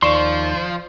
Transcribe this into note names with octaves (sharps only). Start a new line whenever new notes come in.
D#2 F3 D5 C6 C#6 E7